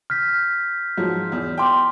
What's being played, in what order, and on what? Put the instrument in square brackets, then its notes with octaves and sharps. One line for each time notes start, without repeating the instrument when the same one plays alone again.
[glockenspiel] F6 G6 B6
[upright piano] G#2 F3 F#3
E2
[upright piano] G5 D6 [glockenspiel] A5 C6